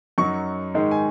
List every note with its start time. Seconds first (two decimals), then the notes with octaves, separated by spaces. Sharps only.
0.18 F#2 F#3 D#4 C#6
0.74 G#2 D#3 G#3 D#4
0.91 G#5